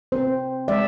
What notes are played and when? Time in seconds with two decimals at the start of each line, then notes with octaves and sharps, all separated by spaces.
0.12 C4 C5
0.68 G#3 D5 E5